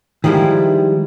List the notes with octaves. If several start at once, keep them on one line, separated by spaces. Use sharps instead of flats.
D#3 F3 G3 G#3 E4